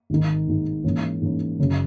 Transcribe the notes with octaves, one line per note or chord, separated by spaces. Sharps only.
G#1 G#2 D#3
G#1 G#2 D#3
G#2 E3 A#3 C#4
G#2 E3 A#3 C#4
F#1 F#2 C#3